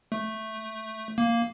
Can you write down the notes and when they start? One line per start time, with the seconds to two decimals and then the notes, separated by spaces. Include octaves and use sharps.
0.12 A3
1.18 A#3